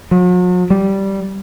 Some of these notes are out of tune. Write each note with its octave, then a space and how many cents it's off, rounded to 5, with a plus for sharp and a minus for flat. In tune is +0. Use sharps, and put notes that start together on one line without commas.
F#3 -45
G3 -10